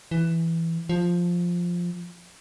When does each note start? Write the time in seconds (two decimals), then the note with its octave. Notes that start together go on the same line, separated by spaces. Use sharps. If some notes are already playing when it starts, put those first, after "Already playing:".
0.11 E3
0.89 F3